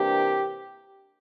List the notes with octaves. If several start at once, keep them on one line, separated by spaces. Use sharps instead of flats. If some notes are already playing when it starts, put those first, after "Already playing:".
Already playing: C3 E3 A#3 D4 G4